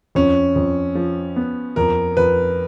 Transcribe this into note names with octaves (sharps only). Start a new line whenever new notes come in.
F2 C#4
F2
F3
B3
F2 A#4
F2 B4